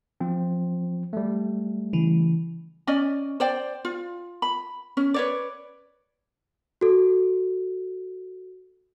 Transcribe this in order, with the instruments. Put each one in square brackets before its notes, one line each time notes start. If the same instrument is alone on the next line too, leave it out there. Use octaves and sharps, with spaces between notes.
[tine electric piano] F3 C4
G3 A3
[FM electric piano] C#3 E3
[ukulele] C#4 D5 D#5 G#5
C5 D5 G5
F4
B5
C#4
B4 C#5 D5
[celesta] F#4 A4